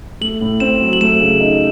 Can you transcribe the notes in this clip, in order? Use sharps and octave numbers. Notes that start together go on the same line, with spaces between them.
A3 F#7
A2
C4 E7
F#3
F#7
A3 E7
C#3
D#4